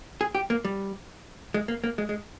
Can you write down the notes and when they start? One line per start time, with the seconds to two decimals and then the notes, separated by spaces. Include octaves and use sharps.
0.21 G#4
0.35 G4
0.50 A#3
0.65 G3
1.54 G#3
1.68 A#3
1.84 A#3
1.98 G#3
2.09 G#3